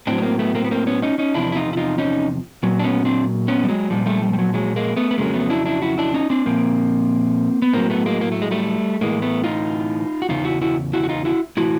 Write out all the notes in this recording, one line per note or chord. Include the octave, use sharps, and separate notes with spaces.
A2 F#3 C4 D4
B3
A#3 C4
A3 B3
A#3 C4
B3
A#3 C4
B3 C#4
C#4 D#4
C#4 D#4
E2 C3 F3 D4 E4
E4
D#4 F4
E4
D#4 F4
C#4 D#4
A#2 F#3
D4
B3 C#4
C4 D4
B3 C#4
G3
F#3 G#3
A#2 F3 G3
G3 A3
G3
G3
F#3
F#3 G#3
G#3 A#3
A3 B3
B3
F2 C#3 F#3 G#3 A#3
A3 B3
D4 E4
D4 E4
E4 F#4
D4 E4
C#4 D#4
C4 D4
A#2 F3 A#3 C4
B3
A2 F#3 A#3 C4
A3 B3
G#3 A#3
A#3
A3
G#3
G3 A3
A2 E3 G#3 A#3
A3 B3
D#4 F4
F#4
E2 C#3 D#4 F4
E4 F#4
E4 F#4
E4 F#4
F#4
D#4 F4
E4 F#4
A2 E3 E4 F#4